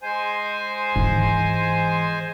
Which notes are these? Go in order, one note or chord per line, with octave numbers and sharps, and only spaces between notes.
G#3 C5 G#5
G#2 E3